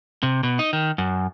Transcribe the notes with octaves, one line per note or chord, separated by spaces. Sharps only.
C3
B2
D#4
D#3
F#2